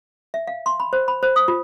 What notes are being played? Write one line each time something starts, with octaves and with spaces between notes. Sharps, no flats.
E5
F5
C6
B5
C5
B5
C5
D#6
F4